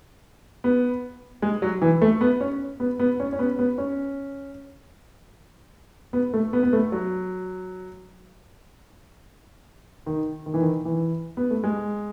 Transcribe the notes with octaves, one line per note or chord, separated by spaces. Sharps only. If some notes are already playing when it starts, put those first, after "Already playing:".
B3
G#3
F#3
E3
A3
B3
C#4
B3
B3
C#4
C#4
B3
B3
C#4
B3
A3
B3
B3
A3
F#3
D#3
D#3
E3
D#3
E3
B3
A3
G#3